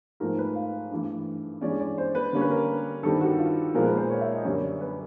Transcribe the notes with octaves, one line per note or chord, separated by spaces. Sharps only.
G#2 F3 A3 A#4
B4
F5
G2 E3 A3
G2 E3 G#3 C#4 D5
D5
C5
B4
D3 G3 A#3 C#4
B4
A#4
G2 D#3 G3 C4 A4
F#4
F4
A#2 F3 G#3 B3 A#4
B4
C5
C#5
E5
D#5
F#2 D3 G3 C#5
D5
B4